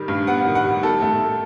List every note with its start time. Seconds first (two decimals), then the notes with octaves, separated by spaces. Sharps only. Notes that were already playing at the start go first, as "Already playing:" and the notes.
Already playing: D#3 G3
0.08 G2
0.27 B3 F#5
0.46 D#3
0.55 F#5
0.64 G3
0.83 D#3 A4
1.02 A3